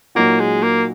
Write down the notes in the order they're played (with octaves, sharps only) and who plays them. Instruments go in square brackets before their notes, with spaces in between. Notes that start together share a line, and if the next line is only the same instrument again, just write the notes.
[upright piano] A#2 F#3 D#4 F#4 [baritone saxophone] A#3
[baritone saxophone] G#3
A#3